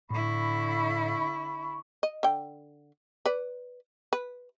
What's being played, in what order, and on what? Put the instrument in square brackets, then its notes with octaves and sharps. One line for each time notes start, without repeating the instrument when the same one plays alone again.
[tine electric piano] A2 [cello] D3 E4 [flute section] B5 C#6
[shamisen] D#5
D3 G5
B4 D5
B4